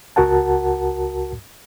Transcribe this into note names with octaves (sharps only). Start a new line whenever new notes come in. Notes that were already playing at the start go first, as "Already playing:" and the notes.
C#2 F#4 A#4 F#5 A5